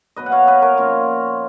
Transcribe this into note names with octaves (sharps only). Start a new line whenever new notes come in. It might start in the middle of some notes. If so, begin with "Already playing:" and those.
B2 F#3 B4 D#5
F#5
C#5 F5
B4 D#5
A#4 C#5
A#2 F3 C#4 F4